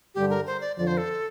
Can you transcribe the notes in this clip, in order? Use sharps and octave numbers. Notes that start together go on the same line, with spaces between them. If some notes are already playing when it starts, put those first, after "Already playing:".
G2 D3 G3 D4 G4
A#4
C5
D5
F2 D3 F3 D5
C5
A4